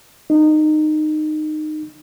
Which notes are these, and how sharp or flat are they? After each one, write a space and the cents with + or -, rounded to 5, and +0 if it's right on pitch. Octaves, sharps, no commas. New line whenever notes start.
D#4 -20